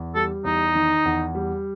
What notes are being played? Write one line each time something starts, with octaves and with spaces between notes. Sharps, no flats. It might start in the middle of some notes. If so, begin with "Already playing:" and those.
Already playing: E2
G3 A4
E2 D#4
D#3
E2
G3